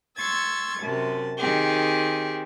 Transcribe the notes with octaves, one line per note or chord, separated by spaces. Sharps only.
C6 C#6 E6 G#6 A6
F#2 C3 A5
D#3 C4 G4 G#4